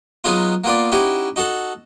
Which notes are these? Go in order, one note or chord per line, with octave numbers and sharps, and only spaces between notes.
F#3 G#3 B3 D#4 F4
A#3 B3 F4 D5
C#4 D#4 E4 F#4 G4
D#4 F#4 A4 F#5